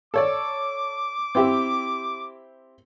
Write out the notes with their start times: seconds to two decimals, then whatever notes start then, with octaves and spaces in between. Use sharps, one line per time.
0.14 A4 C#5 D5 D6
1.35 C4 E4 G4